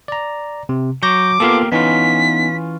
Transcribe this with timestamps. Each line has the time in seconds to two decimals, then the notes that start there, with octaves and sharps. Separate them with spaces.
0.08 D5 A#5
0.69 C3
1.03 F#3 C#6 D6 G6 A#6
1.40 A#3 B3 F4 G4 A4 F5
1.72 E3 B3 C#4 D#4 F4 B6